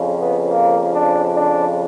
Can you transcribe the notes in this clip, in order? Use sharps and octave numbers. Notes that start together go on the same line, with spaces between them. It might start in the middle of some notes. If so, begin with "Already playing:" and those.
Already playing: F2 C#3 F3
B3
A#3
D4
D4